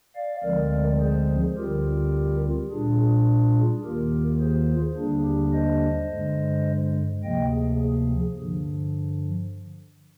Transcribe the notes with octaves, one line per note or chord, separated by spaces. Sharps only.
D5 F5
D2 D3 F3 G#3 C4 A#4 D5
G#4 C5
D2 D3 G3 C4 F4 G4 A#4
A#2 G3 D4 F4 G#4
G#4
D#2 D#3 A#3 F4 G4 A#4
G#4 C5
D#2 D3 G3 A#3 D4 G#4
G4
C5 D#5
G2 D3 G#3
D2 C3 F3 A#3 D#5 G5
G#4
G#4
G2 D3 F3